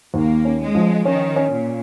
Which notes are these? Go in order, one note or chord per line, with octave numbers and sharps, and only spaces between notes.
D#2 A#3
C#4
G#3
F3
D#3 C#4
C#4
A#2